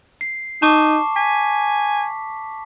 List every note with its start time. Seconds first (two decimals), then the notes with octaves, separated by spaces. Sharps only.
0.21 C7
0.62 D#4 A5 C#6 D6
1.16 G#5 B6